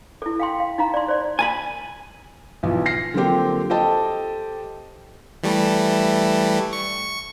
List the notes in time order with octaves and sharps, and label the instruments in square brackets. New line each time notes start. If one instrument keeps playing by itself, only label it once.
[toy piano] E4 A4
F5 G5 C6
F5
D#4 F5 A#5
D5 C6
C5 D5
[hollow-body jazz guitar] G#5 A5 B5
[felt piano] B1 E3 F3
F6 A#6 C7
D3 F3 F#3 A#3 C4 G4
G4 A4 C5 D#5 G5 A5
[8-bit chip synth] E3 G3 A3
C#6